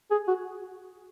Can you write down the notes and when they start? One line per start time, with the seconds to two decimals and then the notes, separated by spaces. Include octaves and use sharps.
0.11 G#4
0.28 F#4